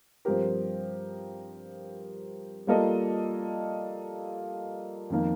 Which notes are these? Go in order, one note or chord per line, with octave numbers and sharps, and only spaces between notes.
G2 F3 C4 G4 A#4
G3 A#3 F4 A4 D#5
F2 D#3 A#3